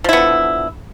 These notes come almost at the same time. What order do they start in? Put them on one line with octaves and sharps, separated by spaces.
F3 E4 B3 D3